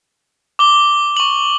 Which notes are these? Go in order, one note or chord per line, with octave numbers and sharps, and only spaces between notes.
D6 G7
C#6 F#7